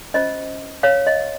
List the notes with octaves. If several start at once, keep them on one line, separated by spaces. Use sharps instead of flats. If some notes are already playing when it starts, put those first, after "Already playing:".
C#4 F4 C5 D#5
C#5 F5
D#5